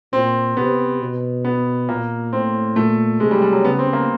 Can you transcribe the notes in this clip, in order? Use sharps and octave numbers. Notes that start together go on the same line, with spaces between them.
A#2 C4
C3 B3
B2
B3
A#2 A#3
A2 C4
A#2 A3
C3 G#3
G3
G3
F#3
C#3 B3
C4
A#3